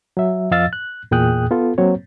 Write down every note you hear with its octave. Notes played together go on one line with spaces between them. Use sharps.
F#3 E5
F2 F3 D#5 F5 E6 A6
F#6
E2 A#2 G#4 G5 D#6 F#6
B3 F4 A4
F#3 A#3 C4 C#5